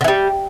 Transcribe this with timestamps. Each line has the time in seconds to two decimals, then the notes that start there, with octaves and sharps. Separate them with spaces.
0.01 D3
0.04 E3
0.08 G3